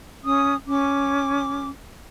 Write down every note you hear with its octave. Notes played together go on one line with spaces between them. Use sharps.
C#4 D#6
C#4 D6